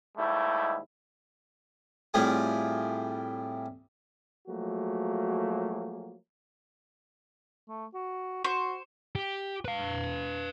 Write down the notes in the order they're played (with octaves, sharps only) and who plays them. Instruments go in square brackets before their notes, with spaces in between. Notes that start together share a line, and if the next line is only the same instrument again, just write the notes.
[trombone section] D#2 G#2 G3 A3 E4
[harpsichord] A2 G3 C4 F4 G#4 D#6
[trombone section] F3 F#3 A3 A#3 F#4 G#4
[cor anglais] A3
F#4
[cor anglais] F#4 [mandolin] C5 C#6
[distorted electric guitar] G4
B4 F5